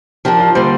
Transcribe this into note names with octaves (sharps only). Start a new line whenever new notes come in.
F3 D4 G4 A#4
F4
D3 G3 A#3 C5